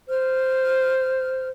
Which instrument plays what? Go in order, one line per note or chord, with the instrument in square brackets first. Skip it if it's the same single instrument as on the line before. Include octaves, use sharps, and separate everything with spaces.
[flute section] C5 F6